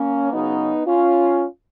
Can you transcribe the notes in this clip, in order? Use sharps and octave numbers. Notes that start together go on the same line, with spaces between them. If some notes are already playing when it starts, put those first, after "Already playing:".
Already playing: A#3 C#4
C#3 F#3 B3 D#4
C#4 F4